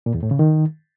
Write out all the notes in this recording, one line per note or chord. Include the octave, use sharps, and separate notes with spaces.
A#2
E2
A2
C#3
D#3